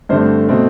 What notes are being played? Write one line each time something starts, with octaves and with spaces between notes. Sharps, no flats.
G2 D3 A3 C4 C5
B2 A3 C4